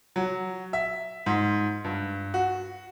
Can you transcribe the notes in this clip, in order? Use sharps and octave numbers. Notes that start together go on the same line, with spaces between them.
F#3
E5
G#2
G2
F#4